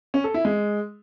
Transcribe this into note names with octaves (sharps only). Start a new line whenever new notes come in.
C#4
A4
E4
G#3